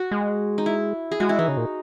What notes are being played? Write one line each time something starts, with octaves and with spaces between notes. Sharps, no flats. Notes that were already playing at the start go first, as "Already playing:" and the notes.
Already playing: F#4
G#3
D#4
E4
G#4
G#3 F#4
E4
E3 D#4
C#3
A#2